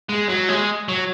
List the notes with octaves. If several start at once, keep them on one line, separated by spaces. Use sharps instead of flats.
G#3
F#3
G#3
F#3